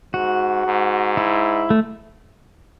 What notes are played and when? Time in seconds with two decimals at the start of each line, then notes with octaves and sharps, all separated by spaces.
0.14 G#2 F#4
0.65 G#2
1.17 E4
1.70 A3